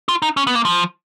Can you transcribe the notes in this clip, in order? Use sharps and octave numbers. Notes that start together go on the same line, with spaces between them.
F4
D#4
C#4
B3
A#3
F3